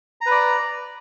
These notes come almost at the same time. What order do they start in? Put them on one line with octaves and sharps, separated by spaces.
A#5 B4 D5